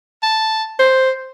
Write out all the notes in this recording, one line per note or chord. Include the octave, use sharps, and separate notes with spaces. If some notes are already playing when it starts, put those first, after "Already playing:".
A5
C5